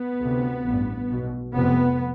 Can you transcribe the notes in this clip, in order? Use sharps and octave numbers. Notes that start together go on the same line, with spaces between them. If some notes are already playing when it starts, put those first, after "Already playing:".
Already playing: B3
D2 C3
A1 G2
B1 B2
F1 F2 C3 B3